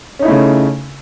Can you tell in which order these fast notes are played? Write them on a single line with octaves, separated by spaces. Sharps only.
C#4 D#4 E4 A3 C#3